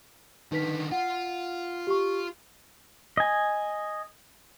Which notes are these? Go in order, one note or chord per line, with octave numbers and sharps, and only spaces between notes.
D3 D#3 D#4 B4 B6
F4 F#5
G4 C#6
D#5 G#5